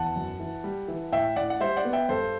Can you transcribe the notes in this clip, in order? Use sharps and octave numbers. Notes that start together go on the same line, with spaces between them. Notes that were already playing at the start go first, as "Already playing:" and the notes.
Already playing: E2 F#5 A5
F#2
E3
G3
E3
A2 E5 G5
A2 D5 F#5
F#5
G3 C5 E5
D5 F#5
B3
E5 G5
G2 A4 C5